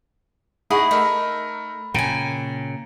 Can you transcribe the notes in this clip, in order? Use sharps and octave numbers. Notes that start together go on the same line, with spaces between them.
D#4 E4 G#4 F#5 B5 C#6 A#6
A3 D#4 A#4 E6
A#2 C#3 G5 G#5 A#5